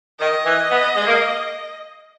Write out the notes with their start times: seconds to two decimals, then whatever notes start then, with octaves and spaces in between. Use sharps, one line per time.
0.20 D#3 D#5
0.45 E3
0.70 B3
0.95 G#3
1.06 A#3